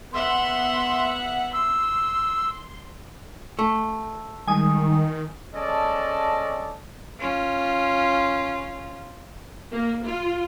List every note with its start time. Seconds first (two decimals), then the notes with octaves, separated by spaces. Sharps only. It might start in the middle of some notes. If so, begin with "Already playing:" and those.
0.13 B3 E5 F#5 C6
1.53 C6 E6
3.59 A3
4.47 D#3 G3 G#3 G#5 D#6
5.54 G#3 C#4 A4 D5 D#5 A5
7.20 C#4 F4
9.71 A#3
10.05 F4